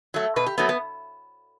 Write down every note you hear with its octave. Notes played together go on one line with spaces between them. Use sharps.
F#3 A3
B2 B4
G4
F#3 A3 B3
B3